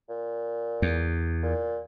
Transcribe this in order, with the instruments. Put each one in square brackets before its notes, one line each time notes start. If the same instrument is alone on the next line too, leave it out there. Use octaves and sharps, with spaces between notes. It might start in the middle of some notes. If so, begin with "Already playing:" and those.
[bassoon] A#2
[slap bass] E2
[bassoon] A#2